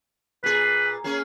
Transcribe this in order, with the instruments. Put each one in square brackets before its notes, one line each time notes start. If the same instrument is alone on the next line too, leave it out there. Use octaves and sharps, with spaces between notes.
[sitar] A#2 G#4 [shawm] B4
[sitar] A#3 C#4 G#4